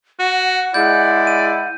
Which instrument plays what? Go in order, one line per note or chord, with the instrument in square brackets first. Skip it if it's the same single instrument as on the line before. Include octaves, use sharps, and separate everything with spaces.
[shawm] F#4 [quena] F#5
[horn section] G#3 E4 [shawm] D5 [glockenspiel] G6
[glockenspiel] D#7